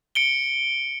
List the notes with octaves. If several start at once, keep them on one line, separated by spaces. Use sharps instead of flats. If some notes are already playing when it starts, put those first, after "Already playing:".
C#7 D7 G7